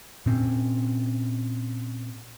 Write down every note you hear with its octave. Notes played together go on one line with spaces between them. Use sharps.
A#2 C4 C#4